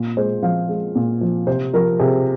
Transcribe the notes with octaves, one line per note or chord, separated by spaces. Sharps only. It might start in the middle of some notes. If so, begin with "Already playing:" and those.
Already playing: A#2
G#3 C5
F3 F5
G#3
A#2
F3
C3 C5
F3 A#4
C3 G#4